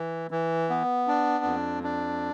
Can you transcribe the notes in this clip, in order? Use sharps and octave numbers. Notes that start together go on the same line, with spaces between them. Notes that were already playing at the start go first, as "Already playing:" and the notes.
Already playing: E3
E3
B3
D4
F2
D4